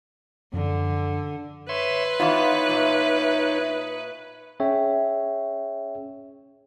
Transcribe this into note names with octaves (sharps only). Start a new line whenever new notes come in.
F#2 D3 F3
B4 C#5 E5 C6
E3 B3 D#4 F4 C#5 E5
A#2
C#4 G#4 C#5 E5 G5